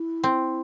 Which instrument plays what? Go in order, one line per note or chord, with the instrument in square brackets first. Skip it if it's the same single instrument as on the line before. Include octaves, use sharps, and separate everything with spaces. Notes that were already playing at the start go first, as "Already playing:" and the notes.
Already playing: [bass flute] E4
[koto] C4